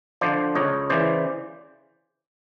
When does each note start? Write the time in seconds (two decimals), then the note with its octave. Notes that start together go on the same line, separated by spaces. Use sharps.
0.21 D3 F3 C5 D5
0.55 C#2 C#5 D#5
0.90 C#3 E3 C5 D5